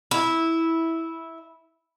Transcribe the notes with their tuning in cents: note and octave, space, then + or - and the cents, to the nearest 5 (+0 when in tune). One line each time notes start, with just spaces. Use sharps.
E4 -10